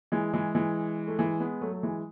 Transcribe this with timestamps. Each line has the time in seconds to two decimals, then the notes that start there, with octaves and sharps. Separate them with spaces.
0.12 E3 G#3
0.33 E3 G#3
0.55 E3 G#3
1.07 A3
1.19 E3 G#3
1.40 G#3 B3
1.61 F#3 A3
1.72 A3
1.83 E3 G#3